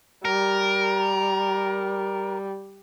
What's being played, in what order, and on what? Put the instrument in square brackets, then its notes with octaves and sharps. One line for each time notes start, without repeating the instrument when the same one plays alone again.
[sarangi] G3 [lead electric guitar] A#4